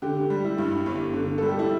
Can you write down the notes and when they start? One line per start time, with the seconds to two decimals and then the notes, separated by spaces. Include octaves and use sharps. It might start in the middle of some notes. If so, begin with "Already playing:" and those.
0.02 D3 G4
0.30 G3
0.44 E4
0.58 G2
0.86 G1
1.14 D3
1.38 G3 A4
1.48 G4
1.59 E4